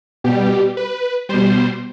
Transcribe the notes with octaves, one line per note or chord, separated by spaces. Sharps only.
B2 G3 G4
B4
B2 G3 C5